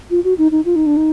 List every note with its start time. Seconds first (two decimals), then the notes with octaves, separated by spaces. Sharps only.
0.11 F4
0.24 F#4
0.38 D#4
0.52 D#4
0.65 F4
0.76 D#4
0.86 D4
0.97 D#4